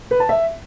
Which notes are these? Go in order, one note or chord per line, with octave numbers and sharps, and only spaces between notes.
B4
A5
E5